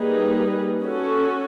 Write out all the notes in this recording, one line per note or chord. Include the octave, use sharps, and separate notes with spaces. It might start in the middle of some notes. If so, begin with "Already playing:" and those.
Already playing: G3 A#3 D#4 G#4 B4
C#4 F#4 A4